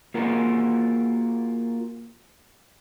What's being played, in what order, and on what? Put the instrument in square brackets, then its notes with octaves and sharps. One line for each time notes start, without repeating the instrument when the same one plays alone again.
[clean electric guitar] A#3 F4 F#4 G#4 A#4